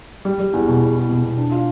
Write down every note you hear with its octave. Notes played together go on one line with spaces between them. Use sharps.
G3
G3
E2
B2
E2
E2
B2
B2
D4
F4